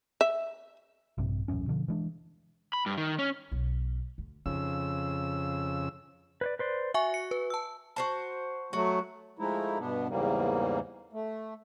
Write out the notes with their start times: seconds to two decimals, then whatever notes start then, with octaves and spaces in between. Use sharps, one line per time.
0.21 E5
1.18 A#1 G2 C3
1.48 D#1 A1 F#2 C#4
1.68 B2 D3 F3
1.88 E3 G#3 D4
2.73 B5
2.86 G2
2.97 D#3
3.19 C#4
3.52 B1
4.18 D2
4.46 F2 C#3 D#4 E6
6.41 B4 C5 D5
6.59 B4 C5 D5
6.94 F#4 E5 G#5 C#6
7.14 C#7
7.31 B4
7.50 A5 E6
7.96 F#4 C5 A5
8.73 F#3 A3 F#4
9.39 F3 G#3 A3 D#4 E4
9.80 G2 B2 B3 D4
10.09 E2 G#2 C#3 E3 G3 A#3
11.13 A3